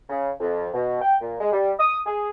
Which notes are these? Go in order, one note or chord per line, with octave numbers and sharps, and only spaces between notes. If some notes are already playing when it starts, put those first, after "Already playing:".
C#3
F2
B2
G5
A#2
G#3
G3
D#6
G#4